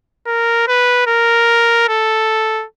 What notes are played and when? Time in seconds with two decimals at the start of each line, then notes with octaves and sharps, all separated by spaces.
0.27 A#4
0.68 B4
1.07 A#4
1.88 A4